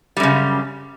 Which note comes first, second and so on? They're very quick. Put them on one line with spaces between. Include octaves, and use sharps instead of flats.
G3 F#2 C#3